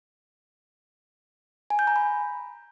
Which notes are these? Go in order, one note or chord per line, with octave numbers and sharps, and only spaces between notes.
G#5
G6
A#5
B5